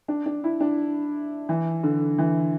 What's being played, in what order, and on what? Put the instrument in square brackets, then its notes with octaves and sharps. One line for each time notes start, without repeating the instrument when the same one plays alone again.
[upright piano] D4
D4
E4
D4
E3
D3
E3